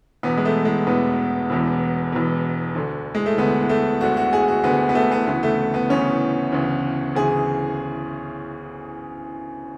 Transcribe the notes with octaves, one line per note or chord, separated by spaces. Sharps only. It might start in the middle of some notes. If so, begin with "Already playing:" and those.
E1 E2 B2 B3
G#3
A3
G#3
E1 E2 B2 B3
E1 E2 B2
E1 E2 B2
D2 D3
G#3
A3
D2 D3 B3
A3
D2 D3 F#4
F#4
G#4
F#4
D2 D3 B3
B3
A3
B3
D2 C#3 E3 B3
A3
B3
D2 C#3 E3 C#4
D2 C#3 E3
D2 C#3 E3 G#4